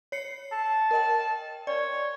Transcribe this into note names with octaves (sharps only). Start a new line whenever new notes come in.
C#5 C7 C#7
A5
A#4 D#5 G5
C#5 D5